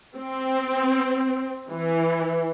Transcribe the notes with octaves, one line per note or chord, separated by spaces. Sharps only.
C4
E3